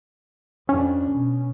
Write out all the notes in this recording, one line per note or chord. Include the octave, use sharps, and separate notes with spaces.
F2 C#4 D4
B2